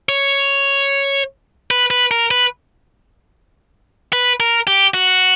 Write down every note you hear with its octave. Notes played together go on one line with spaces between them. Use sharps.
C#5
B4
B4
A#4
B4
B4
A#4
G4
F#4